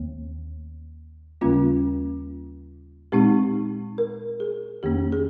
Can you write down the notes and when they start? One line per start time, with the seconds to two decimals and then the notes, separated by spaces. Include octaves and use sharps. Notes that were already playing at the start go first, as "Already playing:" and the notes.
Already playing: D#2 D#3 A#3
1.41 D#2 C#3 G3 A#3 C#4 F4
3.12 A#2 G#3 C4 D#4 G4
3.98 A#4
4.40 G#4
4.83 F2 D#3 A#3 C#4 G4
5.12 G#4